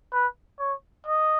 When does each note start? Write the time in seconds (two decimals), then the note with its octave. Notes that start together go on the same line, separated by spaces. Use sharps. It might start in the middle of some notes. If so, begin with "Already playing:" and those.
0.13 B4
0.59 C#5
1.06 D#5